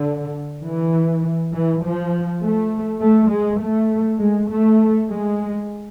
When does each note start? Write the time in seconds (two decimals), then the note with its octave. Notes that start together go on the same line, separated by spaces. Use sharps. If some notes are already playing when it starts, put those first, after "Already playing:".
Already playing: D3
0.64 E3
1.52 E3
1.82 F3
2.42 A3
3.01 A3
3.31 G#3
3.61 A3
4.20 G#3
4.50 A3
5.09 G#3